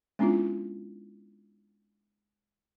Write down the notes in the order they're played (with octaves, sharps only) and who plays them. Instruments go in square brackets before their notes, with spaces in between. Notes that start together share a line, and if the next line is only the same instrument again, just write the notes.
[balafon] G#3 B3 C#4 D4 E4 F4